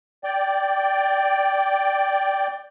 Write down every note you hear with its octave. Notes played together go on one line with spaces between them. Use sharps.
D5 G5